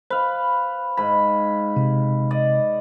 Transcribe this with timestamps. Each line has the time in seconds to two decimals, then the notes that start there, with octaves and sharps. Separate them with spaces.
0.11 B4 C5 F5
0.97 G#2 B5
1.77 C3
2.31 D5 D#5